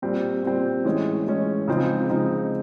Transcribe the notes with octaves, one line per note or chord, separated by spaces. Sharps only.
A#2 G3 C4
A#2 G3 C4
A2 E3 G#3 C#4
A2 E3 G#3 C#4
C#3 F3 G#3 C4 D#4
C#3 F3 G#3 C4 D#4